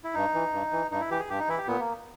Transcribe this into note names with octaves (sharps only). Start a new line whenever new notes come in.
E4
G2 D#4
E3
G2
E3
G2 D#4
E4
E3 G4
G#4
G2 G4
D#4
E3 E4
G4
A#2 B3
A#3